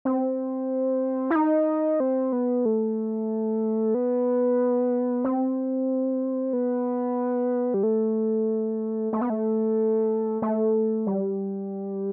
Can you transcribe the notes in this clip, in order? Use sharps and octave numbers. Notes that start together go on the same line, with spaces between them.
C4
E4
D#4
C4
B3
A3
B3
C4
B3
G3
A3
A3
B3
A3
A3
G3